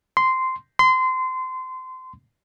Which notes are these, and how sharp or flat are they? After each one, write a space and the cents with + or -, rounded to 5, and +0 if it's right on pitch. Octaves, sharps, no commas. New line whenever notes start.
C6 -10
C6 -25